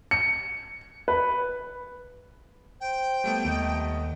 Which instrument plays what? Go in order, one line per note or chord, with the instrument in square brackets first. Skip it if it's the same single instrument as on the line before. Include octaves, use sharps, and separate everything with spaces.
[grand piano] C#7
B4
[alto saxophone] C5 [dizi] G5
[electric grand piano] G3 A3 B3
[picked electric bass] D#2 [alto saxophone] D#5